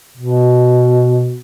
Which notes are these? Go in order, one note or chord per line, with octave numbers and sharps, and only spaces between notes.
B2